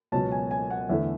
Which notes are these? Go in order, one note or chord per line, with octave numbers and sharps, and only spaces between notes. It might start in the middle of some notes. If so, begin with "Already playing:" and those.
C#2 B2 F#3 C#4 A5
G#5
G#5
F#5
E2 D3 A3 E5